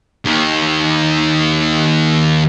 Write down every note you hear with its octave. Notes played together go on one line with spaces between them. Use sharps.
D#2 D#3